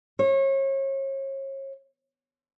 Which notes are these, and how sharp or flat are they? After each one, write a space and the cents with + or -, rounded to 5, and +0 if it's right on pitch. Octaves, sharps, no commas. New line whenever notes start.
C#5 -35